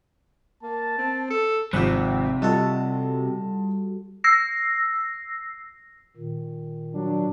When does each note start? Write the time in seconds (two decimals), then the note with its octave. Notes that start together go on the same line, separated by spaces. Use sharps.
0.63 A#3 A5
0.98 C4
1.30 A4
1.73 G#1 C3 F3 G4 E5 F#5
2.42 G3 F4 F#4 A4 D#5 A5
4.24 E6 A#6 C7
6.17 A#2 D#3
6.94 F#3 D4